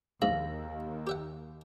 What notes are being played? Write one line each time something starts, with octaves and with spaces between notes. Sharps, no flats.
A#1 D#2 G#2 E5 F5
G4 E5 F#5